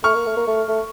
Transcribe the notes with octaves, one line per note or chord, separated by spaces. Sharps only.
A3 C#6 F6
A#3
A3
A#3
A3
A3